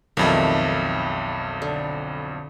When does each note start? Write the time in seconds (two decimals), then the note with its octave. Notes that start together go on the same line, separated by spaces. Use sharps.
0.17 B1 F2 D#3 G3 A3
1.62 D3